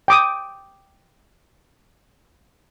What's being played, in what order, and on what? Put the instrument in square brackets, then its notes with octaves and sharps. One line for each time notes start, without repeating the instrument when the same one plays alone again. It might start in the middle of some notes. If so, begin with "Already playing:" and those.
[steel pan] G5 D6 D#6